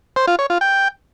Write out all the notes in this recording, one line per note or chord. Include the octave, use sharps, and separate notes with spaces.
C5
F4
C#5
F4
G5